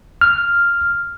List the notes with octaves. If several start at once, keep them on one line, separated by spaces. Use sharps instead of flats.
F6